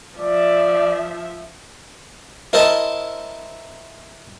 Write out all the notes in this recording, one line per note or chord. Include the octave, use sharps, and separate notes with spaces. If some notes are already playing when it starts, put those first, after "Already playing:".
F3 D5 E5
E4 A#4 C5 D#5 A5